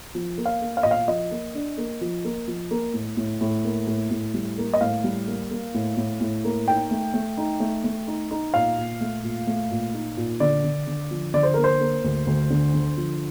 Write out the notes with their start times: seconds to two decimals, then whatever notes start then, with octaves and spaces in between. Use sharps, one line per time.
0.15 F3
0.38 A#3
0.46 F5
0.61 A#3
0.77 F5
0.83 A#2 D#5
0.91 F5
1.08 F3 D#5
1.31 A#3
1.54 D4
1.78 A#3
2.01 F3
2.25 A#3
2.48 F3
2.71 A#3
2.94 A2
3.17 A2
3.41 A2
3.64 A#3
3.87 A2
4.11 A2
4.34 G3
4.58 A#3
4.74 D#5
4.81 A2 F5
5.04 G3
5.27 A#3
5.51 A#3
5.74 A2
5.97 A2
6.21 A2
6.44 A#3
6.68 D#4 G5
6.91 A3
7.14 A3
7.37 D#4
7.60 A3
7.84 A3
8.07 D#4
8.31 D#4
8.54 A#2 F5
8.77 A#2
9.01 A3
9.24 A#2
9.47 A3
9.71 A#2
9.94 D#4
10.17 A#2
10.40 D3 D5
10.64 D3
10.87 D3
11.11 F3
11.34 D3 D5
11.43 C5
11.54 A#3 A#4
11.64 C5
11.81 A#3
12.04 D2
12.27 D2
12.50 D3
12.74 D3
12.97 F3